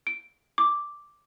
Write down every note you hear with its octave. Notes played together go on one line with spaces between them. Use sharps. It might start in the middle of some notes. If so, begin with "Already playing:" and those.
D7
D6